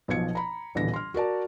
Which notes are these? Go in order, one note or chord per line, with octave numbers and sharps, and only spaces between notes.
B1 B2 F3 G#6 C#7
A#5 B5
D#1 A#1 B2 D3 E3 A#6
C6 F6
F#4 A#4 D5 A5